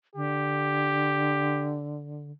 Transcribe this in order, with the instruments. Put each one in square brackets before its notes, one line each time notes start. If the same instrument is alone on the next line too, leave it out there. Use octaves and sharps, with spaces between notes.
[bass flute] D3 [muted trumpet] G4